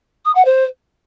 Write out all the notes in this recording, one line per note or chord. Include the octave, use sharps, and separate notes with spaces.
D#6
F#5
C5